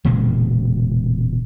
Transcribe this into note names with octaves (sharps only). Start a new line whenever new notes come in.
E1 A#2 C#3 G#3